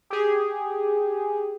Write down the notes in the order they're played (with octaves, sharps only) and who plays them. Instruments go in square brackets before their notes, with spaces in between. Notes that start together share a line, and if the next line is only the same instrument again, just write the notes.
[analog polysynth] G4 G#4